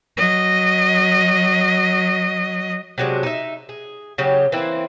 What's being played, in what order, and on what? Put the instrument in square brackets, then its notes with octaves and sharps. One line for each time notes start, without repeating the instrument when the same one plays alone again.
[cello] F#3 D#5
[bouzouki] C3 F#3 G#3 D4
D#4 E5
G#4
C#3 F#3 G4
E3 A#3 C4 E4